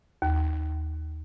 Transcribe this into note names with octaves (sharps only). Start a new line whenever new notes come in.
D#2